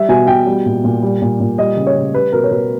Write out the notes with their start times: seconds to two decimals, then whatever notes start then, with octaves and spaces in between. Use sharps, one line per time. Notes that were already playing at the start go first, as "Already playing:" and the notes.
Already playing: G3 E5
0.09 B2 G#5
0.27 B2 G5
0.46 G3
0.66 A#2
0.84 A#2
1.03 G3
1.22 A#2
1.40 A#2
1.58 G3 D#5
1.77 C#3
1.87 C#5
1.95 C#3
2.14 G3 B4
2.32 B2 A#4
2.44 C#5
2.51 B2 B4